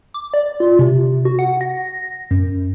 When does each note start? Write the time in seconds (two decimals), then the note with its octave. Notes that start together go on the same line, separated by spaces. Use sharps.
0.14 D6
0.34 D5
0.60 F4
0.79 C3
1.25 F#4
1.39 F#5
1.61 A#6
2.31 F#2